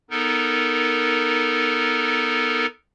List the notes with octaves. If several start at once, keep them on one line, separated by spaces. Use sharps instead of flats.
B3 D#4 A4 A#4